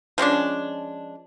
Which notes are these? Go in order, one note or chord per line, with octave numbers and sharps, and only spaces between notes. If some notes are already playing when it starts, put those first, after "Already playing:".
F3 G#3 C#4 D4